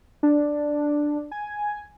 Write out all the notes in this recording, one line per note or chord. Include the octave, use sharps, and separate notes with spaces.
D4
G#5